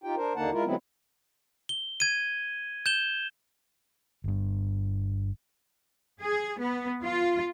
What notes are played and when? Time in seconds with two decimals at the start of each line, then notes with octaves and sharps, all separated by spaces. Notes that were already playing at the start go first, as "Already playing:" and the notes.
0.04 D#4 F4 G4 G5
0.16 D4 A#4 C5
0.36 D#2 D3 A#3 D#4 F#5 A5
0.52 G#3 E4 F4 A#4
0.65 D3 F#3 G#3 B3 C4 E4
1.69 G7
2.00 G#6 D#7
2.86 G6 E7 G7
4.24 G1 G2
6.22 G#4
6.59 B3
7.04 F4